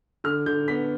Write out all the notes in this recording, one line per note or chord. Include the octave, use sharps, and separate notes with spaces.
D3 F6
D3 G6
B3 B6